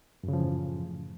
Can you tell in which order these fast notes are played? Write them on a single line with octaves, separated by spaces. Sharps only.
F#2 C#3 F3 E3 A2